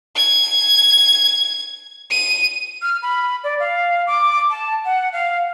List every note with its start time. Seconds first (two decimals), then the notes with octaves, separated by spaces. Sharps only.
0.16 G#6
2.11 D#7
2.82 F6
3.02 B5
3.44 D5
3.60 F5
4.07 D6
4.50 A5
4.85 F#5
5.13 F5